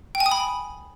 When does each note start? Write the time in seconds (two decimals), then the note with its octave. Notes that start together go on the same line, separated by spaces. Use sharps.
0.15 G5
0.20 G#5
0.26 D#6
0.31 B5